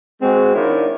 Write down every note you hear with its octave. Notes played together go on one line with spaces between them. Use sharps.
G#3 C4 F#4
D#3 D4 E4 C#5 D5 F5